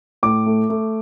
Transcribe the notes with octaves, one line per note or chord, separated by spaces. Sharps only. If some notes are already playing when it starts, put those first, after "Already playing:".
A2 D6
A3
A3